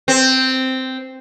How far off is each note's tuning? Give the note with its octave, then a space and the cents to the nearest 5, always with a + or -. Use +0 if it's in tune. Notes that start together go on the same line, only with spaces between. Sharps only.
C4 -5